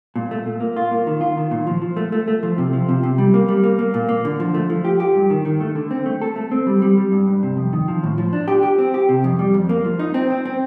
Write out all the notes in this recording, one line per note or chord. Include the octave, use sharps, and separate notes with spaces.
A#2
A3
A#2
A#3
F4
A#3
D#3
F4
D#3
A#2
F3
F3
A3
A3
A3
F3
C3
F3
C3
C3
G3
A#3
G3
A#3
A#3
A#2
A#3
D3
F3
A3
F3
G4
G4
G2
D#3
D#3
A3
D3
C4
A3
A4
A3
C4
G3
G3
G3
G2
G2
C3
F2
D#3
F3
A2
F3
D4
G4
G4
C4
G4
C3
F2
G3
F2
A#3
F3
D#4
C4
C4
C4